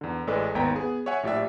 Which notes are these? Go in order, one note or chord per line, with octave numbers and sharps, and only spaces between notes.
E2 D3
A1 A2 G#3 A4 B4 D5
G#1 D#2 B3 G5 A#5 B6
B3 G#4
C#5 E5 F#5 G#5
A#1 A2 G4 D5 E5